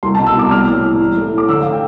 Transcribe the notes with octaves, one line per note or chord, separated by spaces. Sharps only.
C2 C6
B2 A5
E6
C2 D6
G3 F6
A2
A2
E3
A3
A2
D6
D3 E6
F5
G5